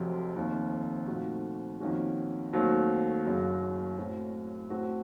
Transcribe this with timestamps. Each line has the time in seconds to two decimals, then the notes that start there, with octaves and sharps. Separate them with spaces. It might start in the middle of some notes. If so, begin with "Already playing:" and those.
Already playing: F1 F2 C3 F#3 C4
0.36 F1 D#2 D#3
1.08 A#2 F3 A3 D#4 F#4
1.80 F2 D#3 A#3 C#4 F#4
2.53 D#2 D#3 F#3 A3 C4
3.25 F#1 F#2 C#3 F#3
3.98 A2 F#3 C4
4.70 A2 A3 C4 F#4 A4